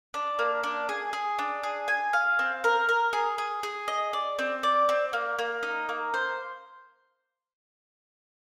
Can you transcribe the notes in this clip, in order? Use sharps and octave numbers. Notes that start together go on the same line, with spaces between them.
D4
A#3
D4
G#4
G#4
D4
G#4
G#5
F5
C4
A#4
A#4
G#4
G#4
G#4
D#5
D5
C4
D5
C4
A#3
A#3
D#4
A#3
C5